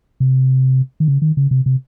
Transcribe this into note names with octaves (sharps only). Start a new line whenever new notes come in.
C3
D#3
C#3
D#3
C#3
C3
C3